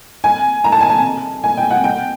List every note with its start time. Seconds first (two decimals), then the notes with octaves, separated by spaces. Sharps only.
0.24 G#5
0.64 A#5
0.72 A5
0.81 G#5
0.89 A5
1.44 G#5
1.57 G5
1.70 F#5
1.84 G5